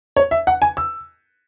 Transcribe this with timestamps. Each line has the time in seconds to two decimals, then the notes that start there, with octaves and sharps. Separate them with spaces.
0.16 C#5
0.31 E5
0.47 F#5
0.62 G#5
0.77 E6